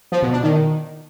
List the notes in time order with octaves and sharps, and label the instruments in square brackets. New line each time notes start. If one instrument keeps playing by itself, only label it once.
[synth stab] F3
B2
D4
D#3